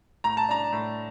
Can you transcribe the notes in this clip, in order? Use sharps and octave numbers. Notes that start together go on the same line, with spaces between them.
A2 A#5
A5
D4 A#5
A2